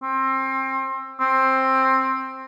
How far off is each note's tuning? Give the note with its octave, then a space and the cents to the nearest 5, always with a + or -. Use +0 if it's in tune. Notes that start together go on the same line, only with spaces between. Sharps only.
C4 +25
C4 +15